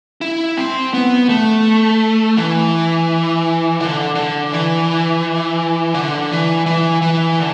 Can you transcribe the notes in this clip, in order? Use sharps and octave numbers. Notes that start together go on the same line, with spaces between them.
E4
C4
B3
A3
E3
D3
D3
E3
D3
E3
E3
E3
D3